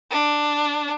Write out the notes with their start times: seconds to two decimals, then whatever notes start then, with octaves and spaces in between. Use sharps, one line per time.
0.11 D4